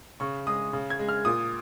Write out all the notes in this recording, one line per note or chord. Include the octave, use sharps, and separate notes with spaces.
C#3 C#6
G#3 D#6
C#3
G#6
G#3
F6
A#2 D#6